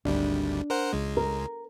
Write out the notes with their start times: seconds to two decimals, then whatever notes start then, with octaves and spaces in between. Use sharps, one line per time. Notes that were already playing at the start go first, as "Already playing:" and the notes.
0.05 G#1 D2 G3 D4
0.70 A#4 C5 F#5
0.93 C#2 G#3
1.17 A#4